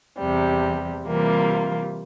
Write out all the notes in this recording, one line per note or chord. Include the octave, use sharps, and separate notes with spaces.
E2 C3 G3
C3 E3 G3 A#3 F4